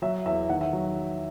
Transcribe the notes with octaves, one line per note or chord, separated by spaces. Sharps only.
F#3 E5
E2 E5
D#3 F#5
E5
F#3